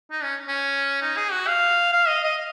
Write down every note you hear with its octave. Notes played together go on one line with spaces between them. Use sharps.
D#4
C#4
C#4
D#4
G#4
F#4
F5
F5
D#5
D#5